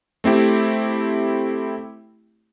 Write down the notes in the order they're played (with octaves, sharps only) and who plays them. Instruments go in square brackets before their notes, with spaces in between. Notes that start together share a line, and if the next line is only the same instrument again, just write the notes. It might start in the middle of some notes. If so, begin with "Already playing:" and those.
[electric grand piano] A3 C4 E4 G4